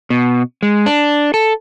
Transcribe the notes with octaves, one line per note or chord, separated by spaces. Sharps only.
B2
G#3
D4
A4